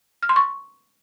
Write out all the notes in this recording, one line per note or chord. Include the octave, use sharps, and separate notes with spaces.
F6
C6
C#6